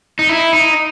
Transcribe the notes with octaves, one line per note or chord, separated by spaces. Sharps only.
D#4
E4
D#4